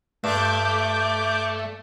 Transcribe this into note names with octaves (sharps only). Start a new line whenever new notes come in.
G2 A3 D6 G6